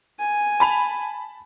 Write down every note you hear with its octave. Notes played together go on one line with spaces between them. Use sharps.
G#5
A5 B5 F7